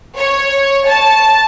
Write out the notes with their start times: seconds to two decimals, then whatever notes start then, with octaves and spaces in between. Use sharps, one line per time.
0.18 C#5
0.88 A5